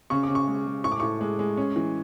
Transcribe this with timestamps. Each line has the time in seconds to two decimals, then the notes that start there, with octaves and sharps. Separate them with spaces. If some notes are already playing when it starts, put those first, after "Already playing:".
0.10 C#3 C#6
0.23 D6
0.29 C#3
0.35 C#6
0.48 G#3
0.66 G#3
0.84 A2 C#6
0.92 D6
1.00 A2 C#6
1.21 G#3
1.39 G#3
1.57 C#4
1.76 E3